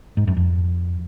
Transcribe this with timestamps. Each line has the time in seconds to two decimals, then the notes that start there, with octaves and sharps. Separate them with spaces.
0.17 G#2
0.27 F#2
0.37 F2